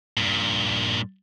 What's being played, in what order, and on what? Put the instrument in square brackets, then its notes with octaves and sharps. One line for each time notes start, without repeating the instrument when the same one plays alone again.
[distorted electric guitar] G2 A#2